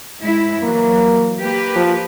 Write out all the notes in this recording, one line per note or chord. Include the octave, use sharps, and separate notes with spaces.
G#2 G#3 E4
E3 F#3 A#3
A#3 G4 B4
F3